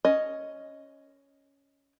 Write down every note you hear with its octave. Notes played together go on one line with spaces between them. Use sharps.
C#4 D#5